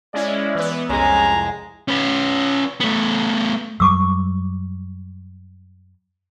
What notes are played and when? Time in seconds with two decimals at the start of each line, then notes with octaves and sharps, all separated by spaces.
0.14 G#3 C#4 E4 D5
0.55 E3 B3
0.89 C2 F2 G#3 C#4 A#5
1.88 C#4 B4
2.80 A3 B3
3.80 F#2 F#3 G3 C#6 D6 E6